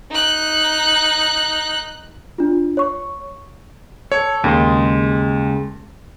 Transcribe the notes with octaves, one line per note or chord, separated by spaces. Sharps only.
D#4 F#6
D4 F4
C#5 C#6
A4 C#5
D#2 C#3 G#3 C6